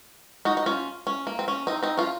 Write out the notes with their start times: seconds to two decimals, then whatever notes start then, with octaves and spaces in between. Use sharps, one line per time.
0.45 D#4 F#4
0.57 D#4
0.66 C#4 F4
1.07 C#4
1.27 A#3
1.39 C4
1.48 C#4
1.67 C4 D#4
1.83 C4 D#4
1.97 C#4 F4